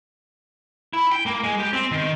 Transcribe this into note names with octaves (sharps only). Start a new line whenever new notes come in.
E4
G5
A#3
G#3
G4
C4
D#3